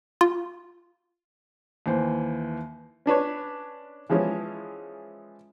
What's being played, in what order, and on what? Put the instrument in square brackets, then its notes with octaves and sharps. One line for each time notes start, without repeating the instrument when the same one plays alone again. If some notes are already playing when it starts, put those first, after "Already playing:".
[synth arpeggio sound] F4
[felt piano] D#2 E3 C5
[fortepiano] C#4 D4 B4 C#5
E3 F3 G#3 C#4 E4